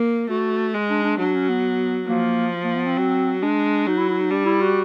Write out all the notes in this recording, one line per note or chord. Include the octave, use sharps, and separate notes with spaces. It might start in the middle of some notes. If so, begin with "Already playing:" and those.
Already playing: A#3
A3 F#4
G#3
D4
D4
F#3 D4
C#4
B3
F3 A#3
A#3
B3
C4
F#3
G#3 D4
F#3 D#4
E4
E4
D#4
G3 D4
E4
F#4